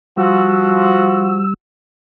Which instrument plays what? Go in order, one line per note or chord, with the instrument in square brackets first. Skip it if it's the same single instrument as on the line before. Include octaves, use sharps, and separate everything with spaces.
[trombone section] F3 F#4 [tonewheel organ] G3 E6